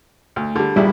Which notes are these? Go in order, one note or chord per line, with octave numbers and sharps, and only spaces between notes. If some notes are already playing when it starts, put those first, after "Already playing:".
D2
D3 G3
A#1 E2 G3 E4